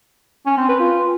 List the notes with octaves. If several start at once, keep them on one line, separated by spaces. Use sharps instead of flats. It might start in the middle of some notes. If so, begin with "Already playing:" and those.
C#4
C4
B4
F4